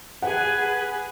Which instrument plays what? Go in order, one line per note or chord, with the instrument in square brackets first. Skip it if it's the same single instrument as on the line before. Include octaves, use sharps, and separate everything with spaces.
[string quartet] G#4 B4 G#5 [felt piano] F#5